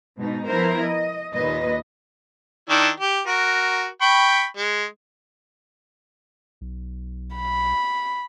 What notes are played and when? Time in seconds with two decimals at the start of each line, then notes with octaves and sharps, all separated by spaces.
0.18 G#2 B2 D#4
0.48 F3 B3 E4 A#4 C5
0.82 D#5
1.33 D#2 A#2 B4 D#5
2.70 D#3 D4 E4
3.00 G4
3.27 F#4 A#4
4.01 G5 B5 C#6
4.57 G#3
6.61 B1
7.35 B5